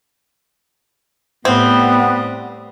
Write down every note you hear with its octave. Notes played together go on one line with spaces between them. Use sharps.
A2 G3 B3 C4